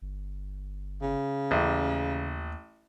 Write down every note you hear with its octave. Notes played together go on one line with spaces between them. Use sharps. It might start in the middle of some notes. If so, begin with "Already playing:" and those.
G1
C#3
A1 D#2